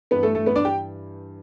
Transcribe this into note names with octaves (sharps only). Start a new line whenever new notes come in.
G2 E3 B3 B4
A3 A4
A3 A4
B3 B4
D4 D5
G4 G5